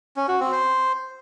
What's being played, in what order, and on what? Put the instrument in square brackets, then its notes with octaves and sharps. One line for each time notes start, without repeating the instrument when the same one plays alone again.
[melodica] C#4
F#4
C4
C5